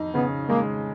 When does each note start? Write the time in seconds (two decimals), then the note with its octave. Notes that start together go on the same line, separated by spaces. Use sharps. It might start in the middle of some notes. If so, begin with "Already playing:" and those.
Already playing: F2 D#4
0.14 C#3 B3
0.49 G#3 A#3